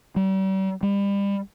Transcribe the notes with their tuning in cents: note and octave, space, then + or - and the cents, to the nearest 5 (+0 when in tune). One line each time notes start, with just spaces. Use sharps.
G3 -40
G3 +30